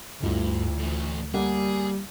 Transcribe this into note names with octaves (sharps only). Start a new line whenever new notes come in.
D2 G2 E4 F4
A2 E3
G3 A#3 G#4 F#5